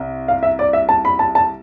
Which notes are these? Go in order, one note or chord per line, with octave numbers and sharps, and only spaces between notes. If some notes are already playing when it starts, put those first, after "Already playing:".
Already playing: C2
F5
E5
D5
E5
A5
B5
A5
A5